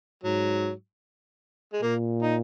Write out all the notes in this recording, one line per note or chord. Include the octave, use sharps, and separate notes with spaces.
G#2 F#3
G#3
A#2 A#3
D#4